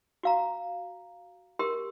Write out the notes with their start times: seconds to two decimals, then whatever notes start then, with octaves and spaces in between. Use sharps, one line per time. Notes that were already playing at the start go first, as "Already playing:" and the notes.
0.23 F#4 F5 A#5
1.59 G4 A#4 C6